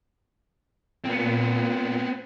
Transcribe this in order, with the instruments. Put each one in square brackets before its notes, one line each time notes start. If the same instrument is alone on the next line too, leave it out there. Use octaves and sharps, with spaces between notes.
[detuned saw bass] A#2 [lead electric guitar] B3 C4